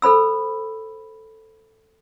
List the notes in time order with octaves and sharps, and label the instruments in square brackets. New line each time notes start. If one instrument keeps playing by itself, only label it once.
[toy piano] A4 C5 B5 E6